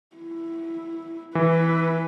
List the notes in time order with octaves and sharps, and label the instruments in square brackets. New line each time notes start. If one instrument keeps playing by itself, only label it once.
[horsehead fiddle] E4
[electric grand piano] E3 [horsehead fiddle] E4 B4